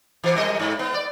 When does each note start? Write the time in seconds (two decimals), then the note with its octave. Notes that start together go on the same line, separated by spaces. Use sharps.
0.24 B2 E3
0.35 F#2 G3 D#5
0.60 G#2
0.79 B3
0.94 D5